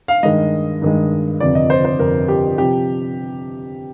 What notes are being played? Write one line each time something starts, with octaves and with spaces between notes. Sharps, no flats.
F5
G2 D#3 G#3 D#5
G2 D#3 G#3
G1 F2 C3 D5
D#5
C5
C5
G1 F2 C3 A#4
G4
C3 F3 G4